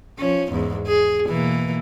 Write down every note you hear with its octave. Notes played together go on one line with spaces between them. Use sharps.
F3 C#4
E2 G#2
G#4
B2 E3 A#3